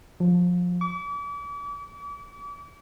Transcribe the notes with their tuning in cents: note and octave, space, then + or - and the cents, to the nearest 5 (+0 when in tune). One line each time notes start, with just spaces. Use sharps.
F3 +25
D6 -40